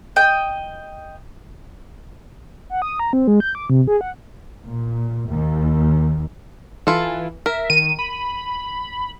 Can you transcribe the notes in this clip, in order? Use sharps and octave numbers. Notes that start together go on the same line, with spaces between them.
D#5 G5
F#5
D#6
A#5
C4
G#3
G6
D6
C3
G#4
F#5
A#2
D#2
E3 E4 F4 A4
A#4 E5
D#3 D#7
B5